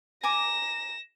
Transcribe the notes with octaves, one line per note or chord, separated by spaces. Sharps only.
G#5 A#5 D6 A#6 E7